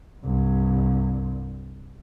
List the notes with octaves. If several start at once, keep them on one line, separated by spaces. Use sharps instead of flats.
C2 G2